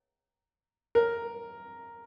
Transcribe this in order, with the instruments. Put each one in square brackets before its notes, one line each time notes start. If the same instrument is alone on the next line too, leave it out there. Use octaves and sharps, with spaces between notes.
[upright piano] A#4